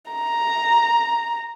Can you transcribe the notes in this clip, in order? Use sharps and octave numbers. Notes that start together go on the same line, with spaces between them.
A#5